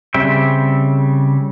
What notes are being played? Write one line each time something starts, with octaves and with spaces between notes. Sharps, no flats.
C#3 G3 C4 E5 G5